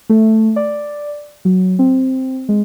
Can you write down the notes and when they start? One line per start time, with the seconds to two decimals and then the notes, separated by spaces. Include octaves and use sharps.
0.09 A3
0.56 D5
1.45 F#3
1.79 C4
2.49 G#3